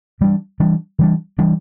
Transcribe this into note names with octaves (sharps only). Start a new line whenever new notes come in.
E3 G3 D4
E3 G3 D4
E3 G3 D4
E3 G3 D4